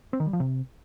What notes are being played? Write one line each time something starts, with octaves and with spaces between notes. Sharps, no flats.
C4
D#3
G3
F3
C3